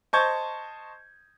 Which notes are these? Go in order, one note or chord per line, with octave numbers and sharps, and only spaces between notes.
C5 D#5 A5 C#6 G6 G#6